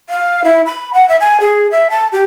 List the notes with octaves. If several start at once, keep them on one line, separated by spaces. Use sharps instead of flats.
F5
E4
B5
F#5
E5
G#5
G#4
E5
A5
G4